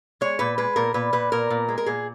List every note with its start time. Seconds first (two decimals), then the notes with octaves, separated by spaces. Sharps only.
0.21 G#3 C#5
0.39 A#2 B4
0.58 G#3 B4
0.76 A#2 A#4
0.94 A#2 B4
1.13 A#2 B4
1.32 A#2 A#4
1.50 A#2
1.69 G#3
1.78 A#4
1.86 A#2 G#4